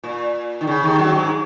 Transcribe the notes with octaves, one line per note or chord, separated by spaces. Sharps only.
A#2
D#3
C#3
D#2 D#3
F#2 F#3
G#2 G#3